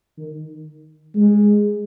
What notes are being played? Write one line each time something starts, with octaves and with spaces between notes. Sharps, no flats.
D#3
G#3